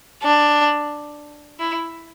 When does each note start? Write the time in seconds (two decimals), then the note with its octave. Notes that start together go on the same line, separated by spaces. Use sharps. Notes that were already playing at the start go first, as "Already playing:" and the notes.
0.23 D4
1.60 E4